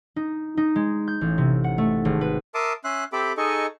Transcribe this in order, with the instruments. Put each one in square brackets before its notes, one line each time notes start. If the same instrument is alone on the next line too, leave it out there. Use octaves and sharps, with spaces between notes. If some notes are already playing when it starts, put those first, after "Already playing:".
[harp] D#4
D#4
G#3
G6
A1
C3
F#5
A3
G#1
B4
[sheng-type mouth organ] A#4 E5 A5 C6 D6 D#6
C#4 E5 C6 F#6
C4 G4 A4 E5 B5 D6
D#4 G#4 A4 D#5 C#6